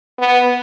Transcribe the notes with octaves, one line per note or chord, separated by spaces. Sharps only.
B3